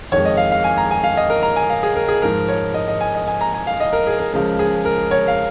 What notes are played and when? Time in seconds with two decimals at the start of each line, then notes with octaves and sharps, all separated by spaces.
0.12 F2 D#3 G#3 C#5
0.25 D#5
0.37 F5
0.52 F5
0.64 G#5
0.78 A#5
0.91 G#5
1.04 F5
1.17 D#5
1.30 A#4
1.43 A#5
1.56 G#5
1.70 F5
1.83 G#4
1.96 A#4
2.09 G#4
2.22 G#2 F3 G#3 A#4
2.48 C#5
2.74 D#5
2.88 D#5
3.01 G#5
3.15 D#5
3.28 G#5
3.41 A#5
3.54 G#5
3.67 F5
3.80 D#5
3.93 A#4
4.07 G#4
4.19 A#4
4.33 C#2 C#3 F3 G#3 A#4
4.59 G#4
4.85 A#4
5.11 C#5
5.28 F5